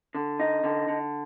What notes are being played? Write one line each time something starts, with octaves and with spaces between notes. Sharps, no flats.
D3
D#4
D3
D3